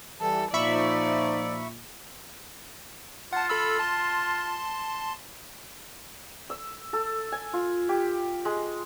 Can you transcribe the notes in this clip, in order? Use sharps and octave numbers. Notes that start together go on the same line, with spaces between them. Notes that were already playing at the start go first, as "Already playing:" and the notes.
E3 G3 A4
A#2 F3 D#4 D5 E5 B5 C#6
F4 F#5 A5
A4 B5 E6
A5 C6
E6
A4
G#5
F4
G4
G#3